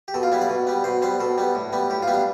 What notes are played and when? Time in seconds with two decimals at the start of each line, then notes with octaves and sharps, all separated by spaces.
0.08 G4
0.14 B2 A4
0.23 F4
0.32 G3 B3 E4
0.41 D5
0.49 B2
0.67 G3 B3
0.84 B2 C5
1.02 G3 B3 C5
1.20 B2 A4
1.38 G3 B3
1.55 A2
1.72 G3 B3
1.90 A2 G4
2.02 F4
2.07 G3 B3
2.13 D4